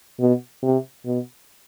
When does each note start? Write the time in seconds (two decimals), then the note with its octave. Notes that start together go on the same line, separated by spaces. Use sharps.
0.19 B2
0.63 C3
1.05 B2